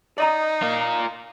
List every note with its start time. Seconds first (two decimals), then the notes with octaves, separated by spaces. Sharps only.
0.18 D#4 D5 D#5 A#5
0.62 F4 A#4